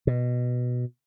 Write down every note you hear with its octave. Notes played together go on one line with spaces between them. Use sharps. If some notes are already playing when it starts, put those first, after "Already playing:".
B2